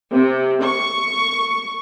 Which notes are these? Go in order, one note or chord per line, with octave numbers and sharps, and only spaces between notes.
C3
C#6